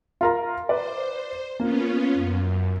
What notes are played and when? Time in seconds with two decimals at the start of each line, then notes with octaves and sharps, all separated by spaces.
0.21 F4 A#4 A#5
0.69 B4 C5 D5
1.60 A#3 B3 C#4 F4
2.14 F#2